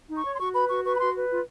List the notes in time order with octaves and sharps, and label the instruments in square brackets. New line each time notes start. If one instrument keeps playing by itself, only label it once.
[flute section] D#4
C#6
C#5
C6
F#4 C#6
B4 B5
F#4 C#6
B4 C#6
B5
F#4 C6
B4
F4